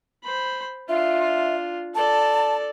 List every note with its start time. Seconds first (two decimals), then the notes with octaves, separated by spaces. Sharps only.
0.24 C5 B5
0.89 D4 F4 E5
1.95 A4 D5 A5